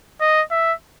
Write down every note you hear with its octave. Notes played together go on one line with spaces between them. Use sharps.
D#5
E5